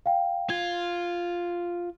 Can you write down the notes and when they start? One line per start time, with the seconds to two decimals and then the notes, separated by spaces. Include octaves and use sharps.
0.06 F5 G5
0.50 F4 G#6